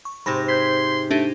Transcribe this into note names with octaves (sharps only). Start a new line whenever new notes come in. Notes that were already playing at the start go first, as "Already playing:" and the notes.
C#6
G#2 C3 B5 C6 A#6
C6 G6 G#6 B6
A3 D4 D#4 G4